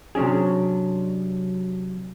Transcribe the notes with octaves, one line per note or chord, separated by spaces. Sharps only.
C3 F#3 C#4 D4 G#4